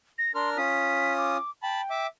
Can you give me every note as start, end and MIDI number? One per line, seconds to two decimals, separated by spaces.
0.18 0.32 94
0.35 0.57 62
0.35 0.57 70
0.35 0.50 84
0.35 0.57 89
0.57 1.37 61
0.57 1.37 65
0.57 1.37 87
0.57 1.14 95
1.18 1.50 86
1.63 2.06 79
1.63 1.81 81
1.63 1.81 83
1.90 2.07 76
1.90 2.07 86